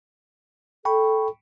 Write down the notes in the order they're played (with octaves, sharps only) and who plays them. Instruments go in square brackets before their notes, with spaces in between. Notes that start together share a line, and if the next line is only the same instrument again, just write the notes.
[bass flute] A4 [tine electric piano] G5 B5 C#6